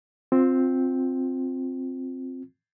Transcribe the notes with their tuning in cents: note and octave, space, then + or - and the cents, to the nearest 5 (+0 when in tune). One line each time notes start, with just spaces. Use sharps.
C4 +0 F4 +20